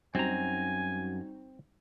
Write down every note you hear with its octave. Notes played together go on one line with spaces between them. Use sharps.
F#2 G3 C4 D#4 F#4 G#5 A#5